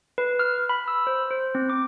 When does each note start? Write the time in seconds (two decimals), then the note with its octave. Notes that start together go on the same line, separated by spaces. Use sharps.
0.18 B4
0.39 F6
0.69 B5
0.88 E6
1.07 C5
1.31 C5
1.55 C4
1.70 D6